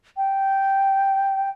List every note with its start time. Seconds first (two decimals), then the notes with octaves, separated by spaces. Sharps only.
0.17 G5